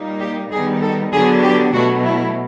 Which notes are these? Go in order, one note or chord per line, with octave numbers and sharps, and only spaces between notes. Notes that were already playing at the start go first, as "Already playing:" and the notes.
Already playing: A#2 G3 A#3 D#4
G4
D#3 G3 B3 D#4 G#4
A4
D3 F#3 B3 D4 G#4
G4
B2 F#3 A3 F#4
E4